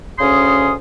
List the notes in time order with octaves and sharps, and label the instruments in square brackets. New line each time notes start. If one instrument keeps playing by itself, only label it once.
[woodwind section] D2 C#3 C#4 G#4 C6 D#6